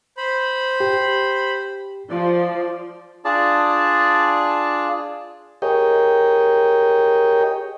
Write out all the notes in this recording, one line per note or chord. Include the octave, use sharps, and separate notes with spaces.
C5 B5
G4
F3 D5
D4 F4 G#4 D5 A5
G4 G#4 A#4 C#5 D#5 G5